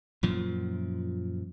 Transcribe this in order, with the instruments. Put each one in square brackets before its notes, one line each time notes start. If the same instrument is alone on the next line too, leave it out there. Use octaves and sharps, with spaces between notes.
[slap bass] F#2 A#2 F3